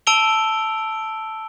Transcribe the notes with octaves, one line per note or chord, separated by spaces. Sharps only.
A5 E6 D7 F7 G7